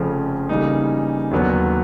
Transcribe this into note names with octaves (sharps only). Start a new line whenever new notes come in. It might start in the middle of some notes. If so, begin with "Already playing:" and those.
Already playing: F1 F2 C#3 F3
C#3 E3 G3 A#3 D#4
D#2 D3 F#3 B3 D4